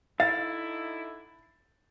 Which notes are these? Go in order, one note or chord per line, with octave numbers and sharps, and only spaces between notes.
D3 D#4 E4 F5 A6